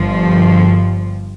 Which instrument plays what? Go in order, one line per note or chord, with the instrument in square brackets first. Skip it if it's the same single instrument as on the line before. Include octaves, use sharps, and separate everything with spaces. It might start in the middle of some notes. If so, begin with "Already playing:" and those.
Already playing: [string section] G1 G2 F3